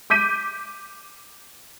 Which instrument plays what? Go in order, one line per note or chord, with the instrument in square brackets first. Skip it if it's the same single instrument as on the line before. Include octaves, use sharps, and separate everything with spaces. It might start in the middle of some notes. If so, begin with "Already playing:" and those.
[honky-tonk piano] D6 G6 B6 D#7